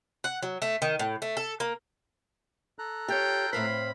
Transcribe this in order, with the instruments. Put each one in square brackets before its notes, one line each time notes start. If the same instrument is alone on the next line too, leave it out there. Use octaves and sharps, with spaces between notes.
[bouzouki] F#5
F#3
A3
D#3
A2
A3
A4
A#3
[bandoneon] A4 A#5 F#6
[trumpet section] F4 G5 [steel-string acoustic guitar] G4 C#5
[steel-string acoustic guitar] A2 C4 C5 [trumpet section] F5 B5